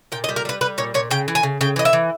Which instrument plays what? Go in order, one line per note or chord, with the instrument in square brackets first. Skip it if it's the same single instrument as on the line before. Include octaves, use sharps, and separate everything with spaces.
[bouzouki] A#2 G5
D#5
G3
A#4
G3 B4
G3 B4
A#2 C#5
A#2 C#5
C#3 G5
E3
G#5
C#3
C#3 G5
E3 D#5
E5
E3